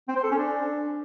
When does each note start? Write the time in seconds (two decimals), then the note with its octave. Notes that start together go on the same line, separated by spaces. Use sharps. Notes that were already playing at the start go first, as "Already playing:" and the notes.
0.08 C4
0.16 C5
0.23 A4
0.31 C#4
0.39 D4